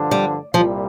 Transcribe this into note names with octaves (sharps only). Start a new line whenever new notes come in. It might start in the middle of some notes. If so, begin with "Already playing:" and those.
Already playing: G2 D3 F3 D4
G3
C2 A#2 F3 G3